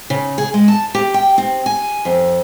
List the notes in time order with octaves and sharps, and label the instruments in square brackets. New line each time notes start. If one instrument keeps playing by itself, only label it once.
[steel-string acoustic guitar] C#3
G#4
G#3
A5
G4
G5
C4
G#5
F2